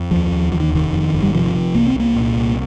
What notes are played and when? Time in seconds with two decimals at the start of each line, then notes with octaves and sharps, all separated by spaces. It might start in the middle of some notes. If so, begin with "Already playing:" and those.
Already playing: F2
0.11 D#2 F3
0.32 D#2
0.52 D#2 F3
0.60 D#3
0.73 F1 D#3
0.93 F2
1.13 G1
1.23 G3
1.34 C3 F3
1.54 C3
1.75 C2 A#3
1.86 C4
1.95 C2 A#3
2.16 A#2
2.36 C2